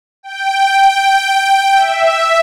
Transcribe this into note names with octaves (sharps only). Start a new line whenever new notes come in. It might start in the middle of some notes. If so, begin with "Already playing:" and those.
G5
E5